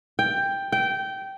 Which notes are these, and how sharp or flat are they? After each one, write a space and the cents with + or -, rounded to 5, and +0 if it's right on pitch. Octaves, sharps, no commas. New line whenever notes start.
G5 +10
G5 -15